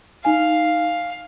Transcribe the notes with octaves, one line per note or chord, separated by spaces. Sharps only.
D#4 F5 G#5